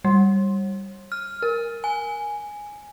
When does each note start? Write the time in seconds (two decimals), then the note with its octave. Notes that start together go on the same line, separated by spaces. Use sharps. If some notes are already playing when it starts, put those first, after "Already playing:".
0.05 G3
1.12 F6
1.42 A#4
1.84 G#5